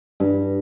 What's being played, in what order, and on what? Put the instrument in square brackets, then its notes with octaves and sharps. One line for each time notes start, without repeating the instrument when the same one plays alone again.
[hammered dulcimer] G2